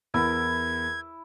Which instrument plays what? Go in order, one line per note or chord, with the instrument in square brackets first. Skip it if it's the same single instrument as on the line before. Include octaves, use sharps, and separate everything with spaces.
[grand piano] E2 A#4 [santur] E4 [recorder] G#6